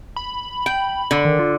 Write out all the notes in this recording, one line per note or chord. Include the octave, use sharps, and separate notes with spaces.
B5
G5
D3
D#3
F4